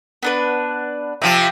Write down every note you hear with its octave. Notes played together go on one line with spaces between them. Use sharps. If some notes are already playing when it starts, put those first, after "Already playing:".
B3 D4 B4
C3 F3 F4 E5 G5